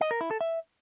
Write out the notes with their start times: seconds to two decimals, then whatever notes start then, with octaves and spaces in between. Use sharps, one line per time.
0.01 D#5
0.11 A#4
0.21 E4
0.31 A4
0.41 E5